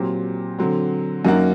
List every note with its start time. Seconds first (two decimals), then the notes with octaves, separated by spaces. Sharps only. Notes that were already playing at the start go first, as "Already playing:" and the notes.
Already playing: A#2 F#3 C4 G4
0.59 D3 F#3 C4
1.25 F#2 F#3 A#3 D#4 F#4